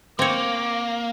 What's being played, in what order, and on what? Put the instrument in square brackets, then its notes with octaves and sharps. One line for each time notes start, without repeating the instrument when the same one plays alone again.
[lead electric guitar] A#3 [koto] C4 C#5 [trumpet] D6